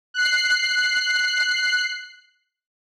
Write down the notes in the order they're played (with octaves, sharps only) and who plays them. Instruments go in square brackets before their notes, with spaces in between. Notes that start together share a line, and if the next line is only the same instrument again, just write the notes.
[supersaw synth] F#6 C7